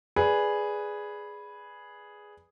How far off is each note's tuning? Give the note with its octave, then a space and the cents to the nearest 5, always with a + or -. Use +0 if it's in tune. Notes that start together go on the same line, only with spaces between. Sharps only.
G#4 +0 B4 -5 D5 -10